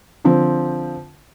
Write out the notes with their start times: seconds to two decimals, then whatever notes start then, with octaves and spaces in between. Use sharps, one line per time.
0.25 D3 F3 C4